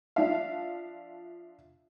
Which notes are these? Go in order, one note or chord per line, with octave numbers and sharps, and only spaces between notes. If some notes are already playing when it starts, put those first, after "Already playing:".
F3 D4 E5 F5